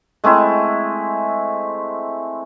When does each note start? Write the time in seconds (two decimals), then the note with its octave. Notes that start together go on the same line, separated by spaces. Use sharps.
0.24 G#3 A3 C4 E4